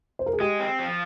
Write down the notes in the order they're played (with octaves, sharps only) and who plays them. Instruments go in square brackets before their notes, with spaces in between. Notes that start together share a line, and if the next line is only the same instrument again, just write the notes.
[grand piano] C5
A#4
G#4
[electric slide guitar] G#3 [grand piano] G4
[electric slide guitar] C4
F3